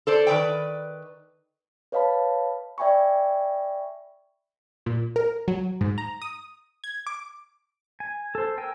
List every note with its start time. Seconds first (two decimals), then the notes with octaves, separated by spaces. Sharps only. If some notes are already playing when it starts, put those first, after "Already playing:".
0.07 A4 C5 D5
0.27 D#3 B4 D5 G5
1.92 B4 C#5 D#5 F5 A5 B5
2.78 D5 E5 G5 G#5 B5 C#6
4.86 A#2
5.16 A#4
5.48 F#3
5.81 G#2
5.98 A#5
6.22 D#6
6.84 G#6
7.07 D6
8.00 G#5
8.35 A4 C5
8.58 A#4 G5 G#5 E6